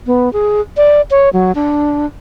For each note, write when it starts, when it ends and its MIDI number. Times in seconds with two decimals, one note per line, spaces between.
0.06 0.32 59
0.33 0.61 68
0.77 1.01 74
1.11 1.29 73
1.33 1.52 54
1.55 2.06 62